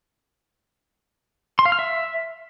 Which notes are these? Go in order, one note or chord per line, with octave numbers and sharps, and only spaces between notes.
C6
F5
F6
E5